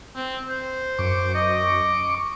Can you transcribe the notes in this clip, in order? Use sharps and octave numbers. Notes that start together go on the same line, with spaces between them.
C4
C5
F#2 C#6 D6
D#5